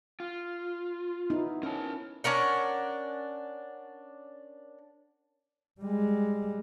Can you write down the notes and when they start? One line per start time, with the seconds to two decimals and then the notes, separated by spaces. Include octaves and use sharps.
0.20 F4
1.30 B3 D#4 E4
1.63 C#4 A#4 A5
2.24 C#4 D4 A#4 F#5
5.81 G3 G#3